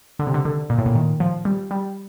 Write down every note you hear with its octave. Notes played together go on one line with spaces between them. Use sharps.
D3
C3
D3
D3
A#2
A2
A#2
D#3
F3
G3
G3